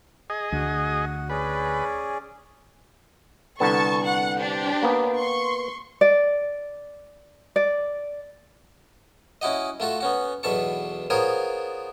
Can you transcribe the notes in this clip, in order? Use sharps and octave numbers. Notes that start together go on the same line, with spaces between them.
G#4 D#5
D2 F#4
C#4 G#4 B4 D5
C2 D3 B3 A4 A5 C#6
F#5
D4 G4 C5
A#3 B3
C6 C#6
D5
D5
C#4 E4 F#4 D#5
A3 F4 F#4 A4
B3 C#4 F#4
B1 E2 B2 A4 A5 C#6
B3 F4 G#4 A#4 C5 C#5